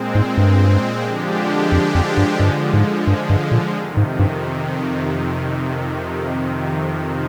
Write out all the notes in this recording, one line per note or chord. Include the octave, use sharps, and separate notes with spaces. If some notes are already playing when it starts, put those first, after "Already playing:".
Already playing: A#2 G#3 C4
G#2
G2
D3 F3 G#3 D4 G4
F2
F2
G2
G2 D3 F3 G#3
G#2
G2
G2
A#2
F2 C3 D#3
G#2
G2